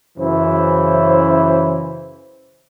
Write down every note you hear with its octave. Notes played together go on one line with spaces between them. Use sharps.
F#2 C#3 E3 E4 C5